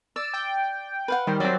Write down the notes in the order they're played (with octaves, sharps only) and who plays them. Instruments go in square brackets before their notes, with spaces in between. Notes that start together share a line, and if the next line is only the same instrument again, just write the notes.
[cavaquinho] D5 [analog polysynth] E6
[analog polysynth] G5
[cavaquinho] B4 F5 F#5
[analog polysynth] D#3 G3 [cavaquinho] C5
[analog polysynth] F#3 C4 [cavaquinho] D5 G5